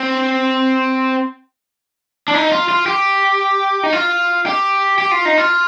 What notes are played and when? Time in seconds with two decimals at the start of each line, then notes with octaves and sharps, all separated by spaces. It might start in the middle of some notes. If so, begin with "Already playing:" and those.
Already playing: C4
2.28 D4
2.34 D#4
2.52 F4
2.69 F4
2.86 G4
3.83 D#4
3.93 F4
4.46 G4
4.98 G4
5.11 F4
5.25 D#4
5.38 F4